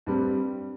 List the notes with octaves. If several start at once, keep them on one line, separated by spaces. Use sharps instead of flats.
G2 G3 C4